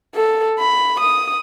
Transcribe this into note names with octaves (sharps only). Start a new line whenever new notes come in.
A4
B5
D#6